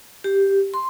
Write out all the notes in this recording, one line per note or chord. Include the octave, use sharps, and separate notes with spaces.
G4
C6